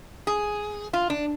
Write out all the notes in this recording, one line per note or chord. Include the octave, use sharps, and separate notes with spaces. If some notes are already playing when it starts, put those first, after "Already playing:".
G#4
F4
D4